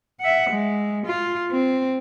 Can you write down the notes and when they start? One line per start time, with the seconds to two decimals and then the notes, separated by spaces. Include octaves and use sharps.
0.21 E5 F#5
0.50 G#3
1.06 F4
1.51 C4